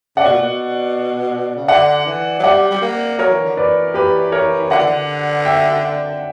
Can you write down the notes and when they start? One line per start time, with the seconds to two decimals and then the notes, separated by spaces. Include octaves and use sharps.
0.17 C#3 D5 F#5
0.25 B2
0.33 A#2
0.42 B2
1.56 C#3
1.68 D3 D5 F#5
2.07 E3
2.39 F#3
2.43 G3 D5 F#5
2.71 G3
2.81 A#3
3.19 F#3 A#4 C#5
3.31 E3
3.44 D3
3.55 E3 B4 D5
3.94 G4 B4
4.32 A#4 C#5
4.70 D3 D5 F#5
4.79 E3
4.87 D3
5.45 E5 G5